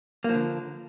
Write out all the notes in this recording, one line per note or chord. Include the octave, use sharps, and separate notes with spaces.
D3 F3 A#3